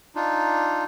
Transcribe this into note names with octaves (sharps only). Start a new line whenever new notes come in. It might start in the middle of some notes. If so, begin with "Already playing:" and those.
D4 D#4 F4